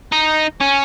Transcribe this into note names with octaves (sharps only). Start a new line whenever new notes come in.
D#4
C#4